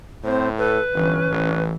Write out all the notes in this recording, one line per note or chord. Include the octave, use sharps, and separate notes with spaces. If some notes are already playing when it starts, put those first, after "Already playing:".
A2 C4 C5
A4 B4
G1 E3 C#4
A1 E3